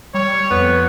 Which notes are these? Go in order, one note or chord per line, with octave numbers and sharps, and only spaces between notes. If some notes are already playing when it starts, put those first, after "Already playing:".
G3 C#5
F2 B3